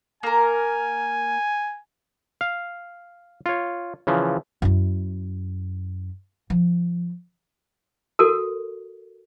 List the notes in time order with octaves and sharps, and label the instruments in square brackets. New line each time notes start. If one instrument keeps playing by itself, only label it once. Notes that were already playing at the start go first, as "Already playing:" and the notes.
[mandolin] A#3 A#4 [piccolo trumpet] G#5
[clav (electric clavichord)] F5
F4 C#5
C#3 E3 F3
[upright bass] F#2 E4
F3
[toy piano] F#4 A4 A#4